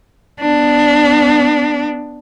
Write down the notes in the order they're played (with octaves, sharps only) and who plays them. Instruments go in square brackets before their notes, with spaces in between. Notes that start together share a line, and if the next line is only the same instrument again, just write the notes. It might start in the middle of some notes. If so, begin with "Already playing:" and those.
[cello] B3 D4